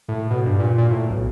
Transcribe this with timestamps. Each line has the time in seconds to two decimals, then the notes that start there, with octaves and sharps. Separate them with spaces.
0.08 A2
0.31 B2
0.46 G2
0.60 A#2
0.78 A#2
0.91 A2
1.10 B1